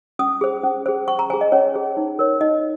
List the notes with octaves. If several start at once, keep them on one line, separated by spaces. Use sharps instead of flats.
C#4 D#6
G#4 C5
C#4
G#4 C5
C#4 C#6
A#5
G#4 C5 G#5
D#5
C#4 C#5
G#4 C5
D#4
A#4 C#5
D#4 D#5